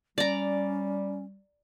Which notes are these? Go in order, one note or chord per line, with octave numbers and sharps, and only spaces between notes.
G3 C#4 D5 A#5